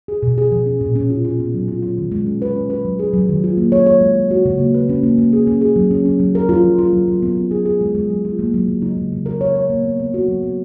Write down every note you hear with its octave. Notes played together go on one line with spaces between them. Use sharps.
G#4
B2
G#4
F3
C#4
A#2
C#4
F4
F4
B3
F#3
F4
F4
D#3
G#3
C#4
B4
C#4
B4
F#3
G#4
F#3
D#3
F4
A#3
C#5
C#5
G#3
G#3
F#4
C#3
A#3
B4
C#4
A#3
A#3
G#4
C#4
G#4
F#3
C#4
C#4
F#3
A#4
F4
F3
F4
F#3
F#3
B3
B3
G#4
G#4
G#3
G#3
F#3
F4
A#3
F#3
C#3
D#4
C#3
C#3
A#4
C#5
C#5
A#3
B3
B3
F#4
F#3
B3